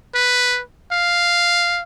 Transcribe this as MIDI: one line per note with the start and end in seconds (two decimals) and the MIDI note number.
0.15 0.61 71
0.91 1.83 77